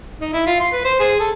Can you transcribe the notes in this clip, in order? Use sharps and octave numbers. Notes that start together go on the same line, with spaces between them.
D#4
E4
F4
C6
B4
C5
G#4
A4